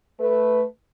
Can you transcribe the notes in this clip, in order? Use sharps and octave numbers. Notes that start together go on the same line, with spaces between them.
A3 B4